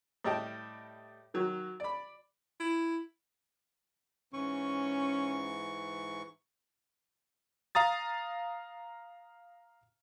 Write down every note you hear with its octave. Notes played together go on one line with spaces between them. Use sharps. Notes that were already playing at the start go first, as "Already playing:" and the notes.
A2 G3 D#5 G5 A5
D#3 F#3
D5 B5
E4
G#2 E3 C#4 C#6
F5 A#5 D#6 A6